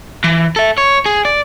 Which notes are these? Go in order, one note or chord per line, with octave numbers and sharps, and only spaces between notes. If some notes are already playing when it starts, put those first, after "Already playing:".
E3
A4 E5
C#5
G#4
D5